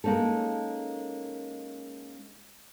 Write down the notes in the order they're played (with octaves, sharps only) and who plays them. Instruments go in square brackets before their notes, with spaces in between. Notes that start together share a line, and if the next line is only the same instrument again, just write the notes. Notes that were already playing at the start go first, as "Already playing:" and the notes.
[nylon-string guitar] G#3 A#3 C#4 D#4 A4